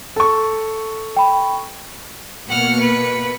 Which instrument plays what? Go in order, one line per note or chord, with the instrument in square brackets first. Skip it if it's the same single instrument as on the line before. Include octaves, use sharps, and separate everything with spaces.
[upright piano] A4 C#6
[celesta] G5 B5
[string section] B2 A#3 C#7 [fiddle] F#5 F6
[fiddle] B4